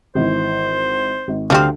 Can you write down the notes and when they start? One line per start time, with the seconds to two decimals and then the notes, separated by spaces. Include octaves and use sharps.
0.15 G#1 E3 C5
1.28 G#1
1.50 D2 F3 G3 C4 F5